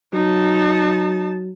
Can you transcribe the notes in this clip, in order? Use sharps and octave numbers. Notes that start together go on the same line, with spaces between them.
F#3 D#4 A5